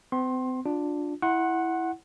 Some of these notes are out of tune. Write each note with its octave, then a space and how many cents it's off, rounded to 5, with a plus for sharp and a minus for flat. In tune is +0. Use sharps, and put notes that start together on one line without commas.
C4 -40 C6 +20
D4 +0 F4 +20
E4 +0 F#5 +0 C6 +40